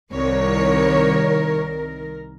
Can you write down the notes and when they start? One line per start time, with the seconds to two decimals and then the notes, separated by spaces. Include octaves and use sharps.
0.13 C2 D#3 A#4 C#5